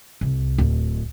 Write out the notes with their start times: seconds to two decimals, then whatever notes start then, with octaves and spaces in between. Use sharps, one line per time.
0.21 C2
0.58 D1